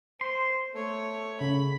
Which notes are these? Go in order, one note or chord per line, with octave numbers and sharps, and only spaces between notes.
C5 C6
A3 C#5
C#3 B5